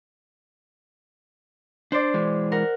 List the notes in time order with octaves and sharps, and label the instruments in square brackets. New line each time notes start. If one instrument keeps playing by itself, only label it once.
[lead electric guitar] D4 [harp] C5 D5
[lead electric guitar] E3 G#3
[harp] A#4 F#5